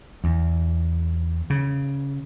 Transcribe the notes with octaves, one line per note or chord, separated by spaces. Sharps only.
E2
C#3